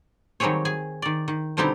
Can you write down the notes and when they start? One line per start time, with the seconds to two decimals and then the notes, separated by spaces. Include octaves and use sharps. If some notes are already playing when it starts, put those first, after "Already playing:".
0.40 D#3 F#3 G3 C4 G#4 C#5
0.65 G#4 G#5
1.02 D#3 D5
1.28 D#3
1.57 B2 D3 G3 C4 D#4 E4